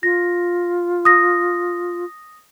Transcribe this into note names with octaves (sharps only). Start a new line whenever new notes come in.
F4 A#6
D#6 A#6